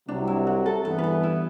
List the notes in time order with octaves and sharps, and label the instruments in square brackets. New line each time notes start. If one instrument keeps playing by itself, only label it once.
[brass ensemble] C2 C3 F#3 [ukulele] D4
[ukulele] E4
F#4
A4
[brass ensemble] G2 E3 B3 [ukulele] A4
[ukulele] B4
A4
E4